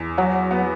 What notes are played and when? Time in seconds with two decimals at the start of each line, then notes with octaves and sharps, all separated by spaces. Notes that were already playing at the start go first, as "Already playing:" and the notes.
Already playing: E2
0.18 F#3 F#4
0.51 B3